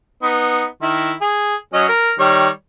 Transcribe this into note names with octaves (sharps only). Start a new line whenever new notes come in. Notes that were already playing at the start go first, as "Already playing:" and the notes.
B3 D#4
D#3 E4
G#4
F#3 C#4 D#5
A#4
D#3 G3 C#5